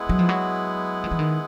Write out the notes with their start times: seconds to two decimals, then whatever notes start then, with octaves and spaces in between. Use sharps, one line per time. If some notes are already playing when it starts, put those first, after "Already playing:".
Already playing: G#3 B3 E4
0.09 F#3
0.19 F3
0.29 F#3
1.04 F3
1.11 E3
1.19 D#3